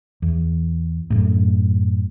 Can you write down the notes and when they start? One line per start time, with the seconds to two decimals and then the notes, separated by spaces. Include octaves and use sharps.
0.22 E2
1.10 F#2 A2